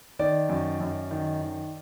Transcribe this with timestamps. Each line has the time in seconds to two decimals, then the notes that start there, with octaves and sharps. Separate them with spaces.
0.19 D#3 D5
0.49 F#2
0.80 F#2
1.11 D#3
1.42 D#3